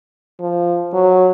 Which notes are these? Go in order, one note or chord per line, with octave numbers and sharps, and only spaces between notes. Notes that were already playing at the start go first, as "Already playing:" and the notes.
F3
F#3